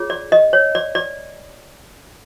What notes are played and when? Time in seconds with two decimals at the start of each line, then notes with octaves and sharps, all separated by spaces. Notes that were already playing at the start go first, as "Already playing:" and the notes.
Already playing: F4 G#4 C#5
0.10 D5
0.32 D#5
0.53 C#5
0.75 D5
0.95 D5